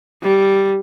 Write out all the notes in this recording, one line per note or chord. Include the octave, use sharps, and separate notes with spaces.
G3